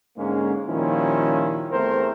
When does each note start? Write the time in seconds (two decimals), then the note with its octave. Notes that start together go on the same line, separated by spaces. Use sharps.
0.17 G#2 D3 G#3 A#3 C#4
0.67 A#2 D#3 F3 G3 C#4 E4
1.72 E2 A3 C4 A#4 C5